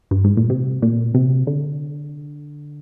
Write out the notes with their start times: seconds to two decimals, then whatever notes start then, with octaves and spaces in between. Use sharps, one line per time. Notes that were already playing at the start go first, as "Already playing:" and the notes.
0.11 G2
0.24 G#2
0.37 A#2
0.50 C3
0.82 A#2
1.14 C3
1.47 D3